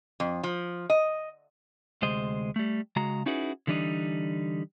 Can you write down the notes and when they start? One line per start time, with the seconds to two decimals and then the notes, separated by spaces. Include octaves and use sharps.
0.20 F2
0.43 F3
0.90 D#5
2.02 D2 C3 G#3 C5 D#5
2.56 G3 A3
2.96 C#3 G#3 F#4 A#5
3.26 C#4 D#4 E4 F#4 G#4 B4
3.67 D3 E3 G3 D4 D#4